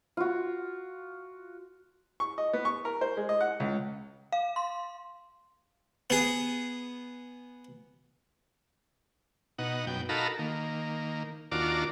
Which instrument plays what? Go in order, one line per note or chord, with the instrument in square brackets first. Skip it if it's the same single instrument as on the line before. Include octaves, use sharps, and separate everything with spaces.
[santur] F4 F#4
[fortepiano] C#6
D#5
B3
C#6
A#4
C5
G#3
D#5
F#5
C#2
[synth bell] F5
C6
[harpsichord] B3 G#4
[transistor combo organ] B2 D#4 F#5
F#2 B2 G5
D#4 F#4 A4 A#4 F5 B5
D#3 A#3
D#2 D4 F4 F#4 A#4 D5